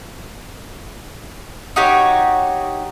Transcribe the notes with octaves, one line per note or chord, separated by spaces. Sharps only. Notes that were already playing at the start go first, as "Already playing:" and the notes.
D#4 F#4 G4 C#5